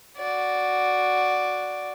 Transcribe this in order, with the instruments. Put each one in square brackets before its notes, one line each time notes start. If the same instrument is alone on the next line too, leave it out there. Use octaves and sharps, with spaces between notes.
[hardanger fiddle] F#4 D5